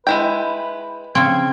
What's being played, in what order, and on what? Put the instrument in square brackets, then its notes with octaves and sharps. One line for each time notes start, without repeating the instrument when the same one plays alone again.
[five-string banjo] G#3 E4 G5 [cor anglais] B4
[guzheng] C#3 C4 [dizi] G#6